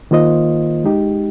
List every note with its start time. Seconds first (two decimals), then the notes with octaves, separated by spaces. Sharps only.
0.11 D#3 A#3 F4 C5 D#5
0.84 G#3 D#4 G4